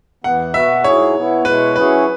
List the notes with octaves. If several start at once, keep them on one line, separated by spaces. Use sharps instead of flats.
E2 E3 B3 F#5
B2 B3 F#4 B4 E5
G#2 F#3 E4 G#4 C#5
B2 B3 E4
B2 G#3 E4 B4 C#5
F#3 C#4 E4 G#4 B4 C#5